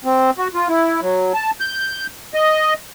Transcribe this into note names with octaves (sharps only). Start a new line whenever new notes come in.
C4
F#4
F4
E4
F#3
A5
G6
D#5